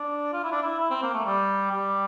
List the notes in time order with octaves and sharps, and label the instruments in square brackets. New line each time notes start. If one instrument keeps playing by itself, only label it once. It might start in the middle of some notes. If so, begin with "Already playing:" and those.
Already playing: [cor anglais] D4
F4
E4
D4
E4
E4
C4
A#3
A3
G3
G3